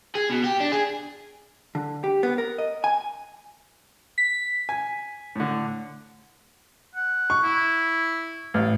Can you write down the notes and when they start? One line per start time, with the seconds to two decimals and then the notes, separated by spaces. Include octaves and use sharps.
0.15 G#4
0.29 B2
0.44 G4
0.60 D4
0.72 G#4
1.75 D3
2.04 G4
2.23 B3
2.38 A#4
2.58 D#5
2.84 G#5
4.18 B6
4.69 G#5
5.36 A2 D3
6.95 F#5
7.30 C#6
7.43 E4
8.54 A1 F5